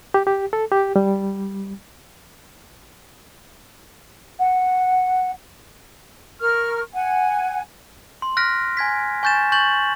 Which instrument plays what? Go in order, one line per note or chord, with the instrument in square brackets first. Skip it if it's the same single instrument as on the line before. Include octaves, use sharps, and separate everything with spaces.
[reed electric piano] G4
G4
A4
G4
G3
[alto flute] F#5
[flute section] A#4 C#6 F6
F#5 G#5
[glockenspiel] C6
F6 F#6 A#6 B6 D7
G#5 G#6 B6
G#5 C#6 G6 A6 E7
C#6 G6 A6 F#7